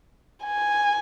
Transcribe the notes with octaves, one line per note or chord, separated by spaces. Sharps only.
G#5